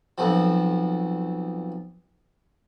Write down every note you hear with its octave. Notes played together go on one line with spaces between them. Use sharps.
B1 F2 F3